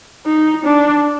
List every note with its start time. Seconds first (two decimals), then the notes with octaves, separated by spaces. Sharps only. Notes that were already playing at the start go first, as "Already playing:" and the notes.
0.26 D#4
0.65 D4